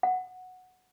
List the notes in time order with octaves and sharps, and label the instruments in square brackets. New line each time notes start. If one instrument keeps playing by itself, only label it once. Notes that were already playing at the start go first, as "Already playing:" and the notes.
[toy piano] F#5